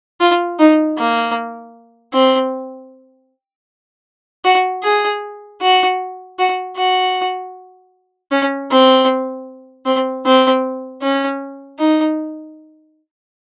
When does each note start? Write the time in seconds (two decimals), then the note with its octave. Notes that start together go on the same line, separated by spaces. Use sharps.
0.20 F4
0.59 D#4
0.97 A#3
2.13 C4
4.45 F#4
4.83 G#4
5.61 F#4
6.39 F#4
6.77 F#4
8.31 C#4
8.71 C4
9.86 C4
10.25 C4
11.02 C#4
11.79 D#4